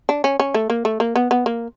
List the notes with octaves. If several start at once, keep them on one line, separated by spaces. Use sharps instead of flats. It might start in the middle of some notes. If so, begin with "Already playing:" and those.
D4
C#4
C#4
A3
A#3
A3
A#3
B3
B3
A#3